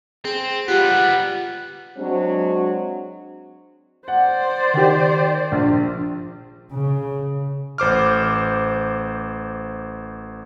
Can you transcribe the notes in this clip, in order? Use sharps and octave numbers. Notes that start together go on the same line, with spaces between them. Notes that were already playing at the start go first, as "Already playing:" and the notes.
C4 G#4
G3 B3 F4 G4 F#5
F#3 G#3 C4 D4
C5 D5 F#5
D#3 G4
A#1
C#3
A1 C5 D6 F6